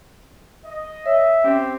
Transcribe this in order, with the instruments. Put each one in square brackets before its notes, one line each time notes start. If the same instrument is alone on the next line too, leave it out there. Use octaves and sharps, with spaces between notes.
[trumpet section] D#5
[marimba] C#5 [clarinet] E5
[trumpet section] C4 G4 [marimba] C#4